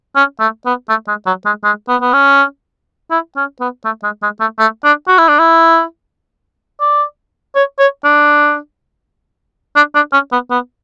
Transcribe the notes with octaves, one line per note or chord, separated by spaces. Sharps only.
C#4
A3
B3
A3
G#3
F#3
G#3
G#3
B3
B3
C#4
E4
C#4
B3
A3
G#3
G#3
A3
A3
D4
F#4
E4
D4
E4
D5
C#5
C#5
D4
D4
D4
C#4
B3
B3